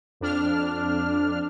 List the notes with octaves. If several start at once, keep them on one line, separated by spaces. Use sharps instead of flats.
F2 D4 F6